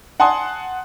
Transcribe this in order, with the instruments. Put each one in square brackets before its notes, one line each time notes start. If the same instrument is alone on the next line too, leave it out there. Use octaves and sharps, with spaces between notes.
[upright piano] F#5 G#5 A5 C6 D#6